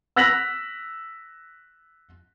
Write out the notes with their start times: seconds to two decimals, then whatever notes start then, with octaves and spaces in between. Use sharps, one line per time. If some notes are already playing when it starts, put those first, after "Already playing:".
0.16 E6 F#6 A#6 B6 F7 F#7